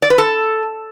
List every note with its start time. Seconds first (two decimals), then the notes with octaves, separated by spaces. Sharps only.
0.02 D5
0.10 B4
0.18 A4